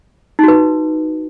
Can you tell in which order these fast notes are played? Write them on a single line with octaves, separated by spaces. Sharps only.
D#4 F#4 B4